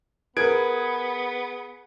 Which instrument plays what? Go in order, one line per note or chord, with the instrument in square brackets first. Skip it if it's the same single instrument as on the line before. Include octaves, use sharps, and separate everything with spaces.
[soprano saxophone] B3 [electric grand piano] G#4 G#6 D7 [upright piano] A#4 B4